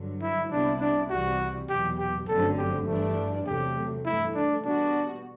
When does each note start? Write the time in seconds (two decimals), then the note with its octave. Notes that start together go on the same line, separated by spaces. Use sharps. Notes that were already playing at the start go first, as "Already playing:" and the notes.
Already playing: G2 D3 F#3
0.22 E4
0.51 C2 C3 G3 B3 D4 E4
0.81 D4
1.10 C2 C3 E3 G3 F#4
1.69 E2 B2 F#3 G4
1.98 G4
2.28 G1 F#2 D3 A3 C4 A4
2.58 G4
2.87 G2 E3 G3 A3 D4
3.47 E2 C3 F#3 A3 G4
4.05 G2 E3 A3 E4
4.35 D4
4.65 B2 G3 B3 D4 F#4